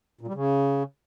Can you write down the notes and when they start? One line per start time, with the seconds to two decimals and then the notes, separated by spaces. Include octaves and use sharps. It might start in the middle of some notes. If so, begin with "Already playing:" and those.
0.21 A#2
0.28 G3
0.34 C#3